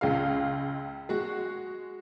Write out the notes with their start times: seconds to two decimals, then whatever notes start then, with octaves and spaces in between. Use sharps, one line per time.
0.01 C#2 G#3 F5
1.09 G#3 F#4